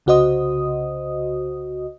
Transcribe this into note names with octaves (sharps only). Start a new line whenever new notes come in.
C2 C#3 F#4 C5 D#5 D#6